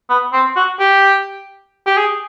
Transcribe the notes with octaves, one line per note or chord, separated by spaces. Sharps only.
B3
C4
F#4
G4
G4
G#4